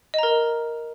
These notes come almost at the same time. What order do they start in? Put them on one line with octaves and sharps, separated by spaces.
D#5 A#5 A#4